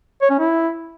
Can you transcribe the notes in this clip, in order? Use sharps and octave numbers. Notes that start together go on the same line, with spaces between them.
C#5
C#4
E4